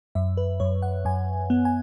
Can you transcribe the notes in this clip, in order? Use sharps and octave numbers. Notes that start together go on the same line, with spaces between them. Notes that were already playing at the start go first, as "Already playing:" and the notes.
F#2 E5
B4
F#2 C#5
F#5
F#2 G#5
B3
G#5